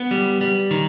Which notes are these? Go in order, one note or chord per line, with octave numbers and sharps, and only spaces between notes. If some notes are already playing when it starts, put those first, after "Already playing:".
Already playing: B3
G3
G3
D#3